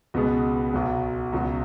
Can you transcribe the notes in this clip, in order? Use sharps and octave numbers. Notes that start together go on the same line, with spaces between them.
C#2 B2 G#3 B3 G#4
B1 B2 F#3
C#2 B2 F#3